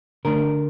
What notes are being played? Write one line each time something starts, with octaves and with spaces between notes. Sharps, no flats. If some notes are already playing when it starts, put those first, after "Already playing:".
D3 A3 D4 A#4